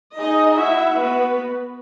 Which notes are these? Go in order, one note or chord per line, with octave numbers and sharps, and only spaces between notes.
D#4 G#4 D#5
E4 F#4 E5
B3 B4